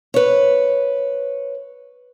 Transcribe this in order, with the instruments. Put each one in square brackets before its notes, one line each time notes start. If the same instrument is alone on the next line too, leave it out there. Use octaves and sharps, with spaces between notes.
[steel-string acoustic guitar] B4 C#5